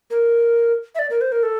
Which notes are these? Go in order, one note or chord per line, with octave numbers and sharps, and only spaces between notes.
A#4
E5
D5
A#4
C5
A#4
A4